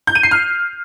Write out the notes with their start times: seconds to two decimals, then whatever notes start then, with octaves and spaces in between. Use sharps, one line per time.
0.07 G6
0.15 D#7
0.23 C7
0.31 F6